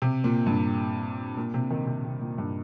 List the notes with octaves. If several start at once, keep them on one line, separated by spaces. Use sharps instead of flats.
C3
A#2
G2
A#2
C3
D#3
C3
C3
A#2
G2